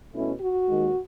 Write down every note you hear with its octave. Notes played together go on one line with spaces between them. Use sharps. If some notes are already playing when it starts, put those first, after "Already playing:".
B2 A3 C#4 E4
F#4
D#2 D#3 G#3